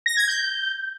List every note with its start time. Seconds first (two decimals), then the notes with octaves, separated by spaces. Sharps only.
0.06 A#6
0.17 G#6
0.27 G6